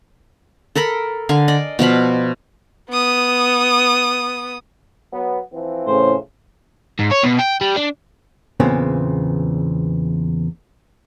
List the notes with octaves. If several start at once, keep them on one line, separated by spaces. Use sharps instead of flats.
A4 A#4 A#5 B5
D3 F5 G#5
D5 D#5
B2 F3 F5 B5
B3 D#6
F#3 B3
E3 F3 C4
A2 C#3 C5
G#2
C#5
B2
G5
G3
D4
E2 A#2 C#3 B3 C4